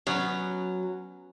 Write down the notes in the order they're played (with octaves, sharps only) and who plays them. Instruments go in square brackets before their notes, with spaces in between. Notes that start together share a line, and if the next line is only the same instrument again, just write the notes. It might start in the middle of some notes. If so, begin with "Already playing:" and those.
[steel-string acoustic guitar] F#3 [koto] B3 C#4